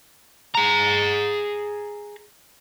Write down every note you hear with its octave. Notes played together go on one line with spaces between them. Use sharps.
G#4 A#5